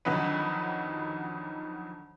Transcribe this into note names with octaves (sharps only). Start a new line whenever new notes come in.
F2 D3 D#3 F#3 D#4 B4